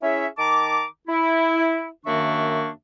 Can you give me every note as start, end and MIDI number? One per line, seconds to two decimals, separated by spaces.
0.03 0.27 61
0.03 0.27 64
0.03 0.27 68
0.03 0.27 73
0.03 0.27 76
0.38 0.83 51
0.38 0.83 81
0.38 0.83 82
0.38 0.83 86
1.08 1.88 64
2.06 2.70 42
2.06 2.70 51
2.06 2.70 58
2.06 2.70 62
2.06 2.70 76
2.06 2.70 85